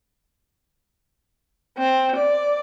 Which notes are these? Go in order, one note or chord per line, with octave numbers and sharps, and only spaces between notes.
C4
D5